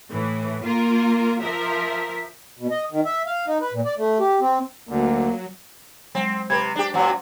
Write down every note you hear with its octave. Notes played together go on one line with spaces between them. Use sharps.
A2 E3
A#3 F4 A#4
F3 A#4 E5
B2
D#5
D#3
E5
F5
D#4
B4
A#2
D5
A3
G4
C4
D2 F#3 A#3
F#3 G#3 C4
C3 B4 B5 G#6
D4 G4
F#2 A#2 F#3 C5 F#5